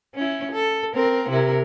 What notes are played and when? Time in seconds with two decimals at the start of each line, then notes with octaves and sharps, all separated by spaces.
0.15 C#4 E4
0.52 A4
0.94 C4 A#4
1.29 C3 E4 A#4